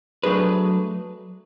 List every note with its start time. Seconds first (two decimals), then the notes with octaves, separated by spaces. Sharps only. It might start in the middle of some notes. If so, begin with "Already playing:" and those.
0.23 F#3 A3 D4 G#4 B4